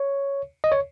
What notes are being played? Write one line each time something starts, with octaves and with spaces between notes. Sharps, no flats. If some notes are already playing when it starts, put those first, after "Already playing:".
Already playing: C#5
D#5
C#5